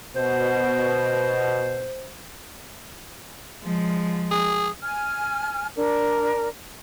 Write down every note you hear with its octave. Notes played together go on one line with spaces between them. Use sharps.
B2 C5
F3 G#3
G#4
G#5 F6
D4 A#4